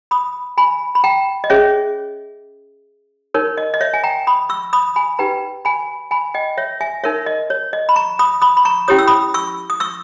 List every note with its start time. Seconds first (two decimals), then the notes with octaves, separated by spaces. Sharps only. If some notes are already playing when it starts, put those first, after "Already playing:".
0.11 B5 D#6
0.57 G#5 B5
0.95 B5
1.04 G5 A#5
1.44 D#5
1.50 C#4 G#4 C#5 E5
3.34 D#4 A#4 C#5
3.58 D#5
3.74 D#5
3.81 C#5 E5
3.94 G#5
4.04 G5 A#5
4.27 B5 D#6
4.49 C#6 E6
4.73 B5 D#6
4.96 G#5 B5
5.19 D#4 G4 B4 G5 A#5
5.65 G#5 B5
6.11 G#5 B5
6.34 D#5 G5
6.58 C#5 E5
6.81 E5 G#5
7.04 D#4 A#4 C#5 E5
7.26 D#5
7.50 C#5
7.73 D#5
7.89 B5
7.96 A#5 C#6
8.19 B5 D#6
8.42 B5 D#6
8.57 B5
8.65 A#5 C#6
8.88 C#4 E4 G4 C#5 D#6
8.99 E6
9.07 B5 D#6
9.34 C#6 E6
9.70 D#6
9.80 C#6 E6